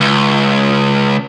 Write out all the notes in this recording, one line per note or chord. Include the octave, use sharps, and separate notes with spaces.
C#2